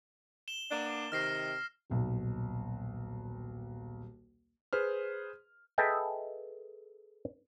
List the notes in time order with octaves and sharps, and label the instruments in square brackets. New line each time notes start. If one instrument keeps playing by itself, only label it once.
[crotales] E7 G7
[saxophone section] A#3 B3 D4
[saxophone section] C3 D#3 [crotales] F6 A#6 C7
[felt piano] D#1 B1
[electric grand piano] G#4 B4 C5 F6
[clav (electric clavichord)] G#4 A4 B4 D#5 E5 G5